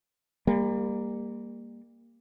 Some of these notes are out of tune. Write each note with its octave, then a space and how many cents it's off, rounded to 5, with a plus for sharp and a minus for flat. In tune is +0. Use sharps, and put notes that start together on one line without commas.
G3 +35 A#3 +0